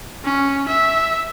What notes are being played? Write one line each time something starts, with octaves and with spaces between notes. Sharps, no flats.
C#4
E5